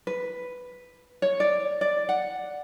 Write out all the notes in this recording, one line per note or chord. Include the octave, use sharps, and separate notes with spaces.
B4
C#5
D5
D5
F#5